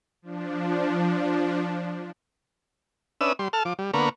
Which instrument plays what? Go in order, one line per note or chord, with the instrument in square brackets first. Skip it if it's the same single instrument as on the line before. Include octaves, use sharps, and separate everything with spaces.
[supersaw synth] F3 D4
[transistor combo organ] C#4 D4 B4 E5 D#6 E6
G3 C6
A4 A5 F6
F3 D6
G3
D3 A#3 B3 A#5 B5 C#6